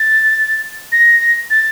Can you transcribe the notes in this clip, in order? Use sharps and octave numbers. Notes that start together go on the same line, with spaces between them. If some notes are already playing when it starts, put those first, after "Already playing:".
Already playing: A6
A#6
A6